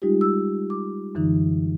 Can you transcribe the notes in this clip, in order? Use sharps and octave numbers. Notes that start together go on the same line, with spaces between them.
G3 G#3 D#4 F4 G4
E6
D6
F#2 D3 E3 D#4